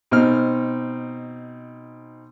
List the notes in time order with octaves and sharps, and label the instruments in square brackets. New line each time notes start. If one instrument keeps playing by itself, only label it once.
[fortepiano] B2 C4 D#4 F6